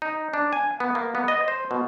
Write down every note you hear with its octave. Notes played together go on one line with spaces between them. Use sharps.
D#4
D4
G#5
B3
A#3
B3
D#5
C5
B2